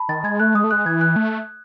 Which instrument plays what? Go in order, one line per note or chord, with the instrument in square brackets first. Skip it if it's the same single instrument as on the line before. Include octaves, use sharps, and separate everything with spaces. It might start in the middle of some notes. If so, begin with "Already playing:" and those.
Already playing: [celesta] A5 B5
[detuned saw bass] D#3 [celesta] A6
[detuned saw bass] G#3 [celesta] G#6
[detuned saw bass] A3 [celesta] F#6
[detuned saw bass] G#3 [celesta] D#6
[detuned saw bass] A3
[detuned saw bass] G#3 [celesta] F#6
[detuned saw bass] E3 [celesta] G#6
[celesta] F#6
[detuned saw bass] A3